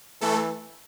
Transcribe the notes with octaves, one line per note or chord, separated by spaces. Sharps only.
E3 A3 A4